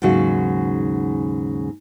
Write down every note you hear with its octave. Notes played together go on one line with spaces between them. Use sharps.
D#2 G#2 C#3 F#3 F#4